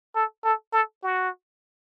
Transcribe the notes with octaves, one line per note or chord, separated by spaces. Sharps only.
A4
A4
A4
F#4